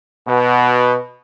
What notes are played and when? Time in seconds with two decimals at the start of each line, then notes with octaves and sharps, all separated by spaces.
0.28 B2